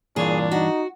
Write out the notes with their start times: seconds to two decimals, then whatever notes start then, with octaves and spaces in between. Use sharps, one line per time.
0.16 G2 A#2 E3 D4 G#4 C#5
0.51 D#4 F#4